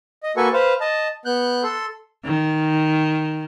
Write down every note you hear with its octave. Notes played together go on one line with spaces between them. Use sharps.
D#5
A#3 F#4 A4 B4 G#5 C#6
B4 C5 F5
D#5 A5
B3 F#6 G6
A4 C6
D#3